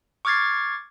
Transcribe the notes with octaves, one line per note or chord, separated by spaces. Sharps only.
C#6 D6 F6 G#6 A6 C7